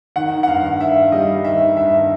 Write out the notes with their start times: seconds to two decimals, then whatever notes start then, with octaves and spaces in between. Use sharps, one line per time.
0.16 D#3 F#5
0.43 F#5
0.47 G2 F5
0.80 G2 E5
1.12 G3 D#5
1.44 D#3 E5
1.77 G2 E5